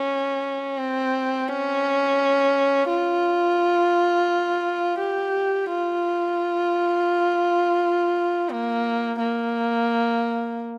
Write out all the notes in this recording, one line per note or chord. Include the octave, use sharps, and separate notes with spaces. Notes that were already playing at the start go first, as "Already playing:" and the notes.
Already playing: C#4
C4
C#4
F4
G4
F4
A#3
A#3